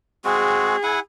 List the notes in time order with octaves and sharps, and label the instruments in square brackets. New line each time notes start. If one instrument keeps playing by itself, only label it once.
[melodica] G#3 C4 F#4 [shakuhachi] G#4
[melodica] E4 F#5 G#5